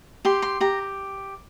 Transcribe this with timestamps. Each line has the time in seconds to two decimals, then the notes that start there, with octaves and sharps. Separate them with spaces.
0.25 G4 C6
0.42 C6
0.61 G4 A#5